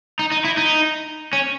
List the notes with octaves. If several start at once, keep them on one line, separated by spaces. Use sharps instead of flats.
D#4
D#4
E4
D#4
C#4